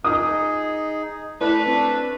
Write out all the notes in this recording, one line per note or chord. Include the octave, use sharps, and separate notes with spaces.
D#4 G#4 D#6
A3 E4 B4 D5
C4 D4